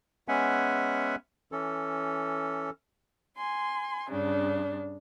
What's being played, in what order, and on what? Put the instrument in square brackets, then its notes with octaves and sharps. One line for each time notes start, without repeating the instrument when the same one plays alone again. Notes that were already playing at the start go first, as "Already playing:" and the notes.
[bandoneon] G#3 B3 C#4 E5 F#5 G#5
E3 C#4 A4
[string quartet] G#5 C6
G2 C#3 D4